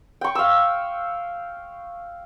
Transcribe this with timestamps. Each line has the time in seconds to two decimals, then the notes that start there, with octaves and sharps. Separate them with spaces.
0.21 G5 C#6
0.35 F5 E6